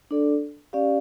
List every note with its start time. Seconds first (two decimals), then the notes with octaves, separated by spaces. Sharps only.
0.11 D4 A4 D5
0.73 C#4 G4 D5 F5